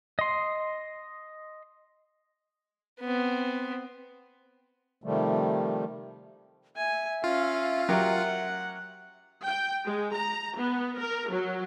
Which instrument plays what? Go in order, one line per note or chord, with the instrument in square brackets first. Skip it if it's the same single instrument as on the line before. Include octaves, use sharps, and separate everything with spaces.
[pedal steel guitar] D#5 C6
[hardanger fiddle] B3 C4
[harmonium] C3 D#3 F3 G3 A3
[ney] E5 [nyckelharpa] G#5
[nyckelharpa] C#4 F5 [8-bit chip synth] F4
[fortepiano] F#3 G4 A#4 [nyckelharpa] F#5
[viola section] G5
G#3
A#5
B3
A#4
F#3